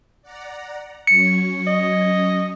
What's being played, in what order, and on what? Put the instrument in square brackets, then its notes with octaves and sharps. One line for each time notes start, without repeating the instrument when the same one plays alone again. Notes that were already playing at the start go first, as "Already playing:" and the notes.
[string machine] D5 F#5 A#5
[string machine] F#3 C#4 C#5 [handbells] C#7
[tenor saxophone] D#5